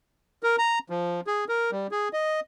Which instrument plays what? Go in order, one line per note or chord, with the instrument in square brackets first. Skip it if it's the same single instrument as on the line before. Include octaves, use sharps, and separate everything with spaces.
[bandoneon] A#4
A#5
F3
G#4
A#4
G3
G#4
D#5